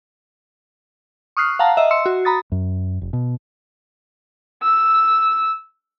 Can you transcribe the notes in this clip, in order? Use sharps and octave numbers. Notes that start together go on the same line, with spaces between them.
C#6 D#6 F6 F#6 C7
F5 F#5 A5 A#5
D#5 E5
C6 E6 C#7
F#4
A#5 B5 D#6 A6
F#2
F1
B2
E6